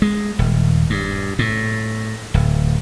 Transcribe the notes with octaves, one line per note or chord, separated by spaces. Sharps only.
G#3
D#1
G2
A2
D1